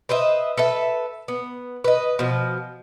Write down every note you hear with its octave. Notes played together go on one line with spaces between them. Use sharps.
B4 C5 D#5 E5
A4 B4 E5
B3
B4 D#5
B2 F3